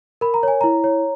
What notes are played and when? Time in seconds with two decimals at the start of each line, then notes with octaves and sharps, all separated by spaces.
0.21 A#4 B5
0.34 A#5
0.43 C#5 G#5
0.61 E4 A#5
0.84 C#5